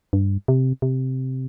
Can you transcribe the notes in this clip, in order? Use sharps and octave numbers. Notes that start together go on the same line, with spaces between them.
G2
C3
C3